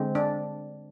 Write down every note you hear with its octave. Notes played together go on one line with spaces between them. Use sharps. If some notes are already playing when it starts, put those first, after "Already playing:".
Already playing: D3 G#3 C4
D4